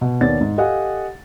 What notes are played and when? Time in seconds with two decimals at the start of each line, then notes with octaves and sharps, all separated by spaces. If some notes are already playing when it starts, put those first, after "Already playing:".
0.01 B2
0.21 D#2 B3 C#5 D5 A6
0.41 G#2
0.58 G4 A4 D#5 F5 F#5 G#5